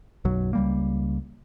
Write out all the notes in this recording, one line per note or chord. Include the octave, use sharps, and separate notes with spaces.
B1 F#2 F#3
C#2 G3 A#3